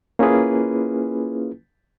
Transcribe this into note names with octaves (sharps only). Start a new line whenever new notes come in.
A#3 C#4 E4 F4 G#4 B4